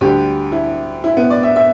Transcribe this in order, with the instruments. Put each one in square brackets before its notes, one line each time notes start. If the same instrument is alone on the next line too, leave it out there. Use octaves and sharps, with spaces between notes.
[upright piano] D2 D3 G3 G4
E4
E4
B3
D5
E5
E5